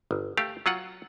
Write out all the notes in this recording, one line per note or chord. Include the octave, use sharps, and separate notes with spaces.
G1
A3 G4 F5
F#3 F4 F#5